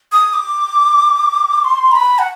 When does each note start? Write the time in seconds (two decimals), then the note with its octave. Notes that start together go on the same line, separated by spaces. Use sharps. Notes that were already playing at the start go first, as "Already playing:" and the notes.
0.12 D#6
0.33 D6
1.64 C6
1.91 A#5
1.96 B5
2.19 F#5